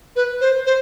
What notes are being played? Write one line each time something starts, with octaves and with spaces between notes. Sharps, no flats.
B4
C5
C5